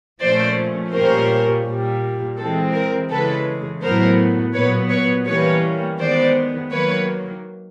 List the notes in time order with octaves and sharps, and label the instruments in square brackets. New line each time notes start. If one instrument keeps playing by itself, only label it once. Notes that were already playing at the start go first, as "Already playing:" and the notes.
[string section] A#2 F3 A3 C#4 C5 D5
A#2 G3 A#3 C#4 A#4 C5
A#2 G3 A#3
E3 G#3 C4 A4
A#4
C#3 E3 G#3 A4 B4
A2 F#3 B3 A#4 C5
A#2 F#3 B3 B4 C#5
B4 C#5
E3 G3 A#3 C#4 B4 C#5
D#3 G#3 B3 C5 D5
D#3 F#3 A#3 B4 C#5